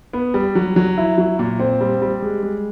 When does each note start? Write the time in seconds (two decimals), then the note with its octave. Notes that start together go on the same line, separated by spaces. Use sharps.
0.13 B3
0.34 G3
0.55 F#3
0.76 F#3
0.97 E4
1.18 F#3
1.39 A#2
1.60 C4
1.81 G3
2.02 G3
2.22 G#3
2.43 G#3